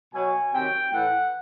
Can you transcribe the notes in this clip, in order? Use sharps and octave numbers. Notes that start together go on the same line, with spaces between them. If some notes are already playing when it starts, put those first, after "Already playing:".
B2 F#3 G#5
C3 D#3 F#3 G5
A2 E3 F#5